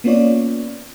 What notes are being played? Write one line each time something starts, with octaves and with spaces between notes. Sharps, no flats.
A#3 B3 C#4 F4 C#5 D5